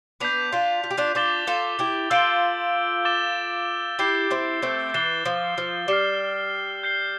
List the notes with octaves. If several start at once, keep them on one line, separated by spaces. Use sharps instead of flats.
B3 D4 G6 B6 F7
D4 F4
F4
G4
D4 F4
D4 F4 D6 A6 E7 G7
F4 A4
E4 G4
F4 A4 E6 G6 D7 G7
D6 A6 E7 G7
E4 G4 G6 C7 G7
C4 E4
A3 C4
E3 A6 C7 E7 G7
F3
F3
G3 F6 C7 E7 G7
G6 C7 G7